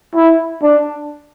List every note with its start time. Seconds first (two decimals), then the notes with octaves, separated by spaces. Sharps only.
0.15 E4
0.63 D4